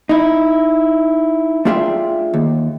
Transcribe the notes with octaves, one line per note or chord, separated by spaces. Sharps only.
D#4 E4
A3 D4 F4 G#4 E5 G5
D#2